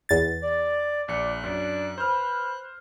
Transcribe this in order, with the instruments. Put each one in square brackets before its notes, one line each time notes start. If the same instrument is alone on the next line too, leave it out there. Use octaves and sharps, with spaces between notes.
[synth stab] E2 A6
[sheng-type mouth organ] D5
[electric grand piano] A#1 C#7 [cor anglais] D5 [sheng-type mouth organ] F#6
[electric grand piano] F#2 [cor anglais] D4
[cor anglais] B4 [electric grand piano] C5 F6